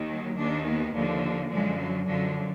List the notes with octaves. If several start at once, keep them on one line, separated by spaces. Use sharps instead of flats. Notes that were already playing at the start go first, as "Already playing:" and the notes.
Already playing: D#2 D#3
F#3
D#2 D#3 D4
B3
D#2 D3 F3 A#3
F#2 D3 F3 G#3
F#3
F#2 D3 F3 F#3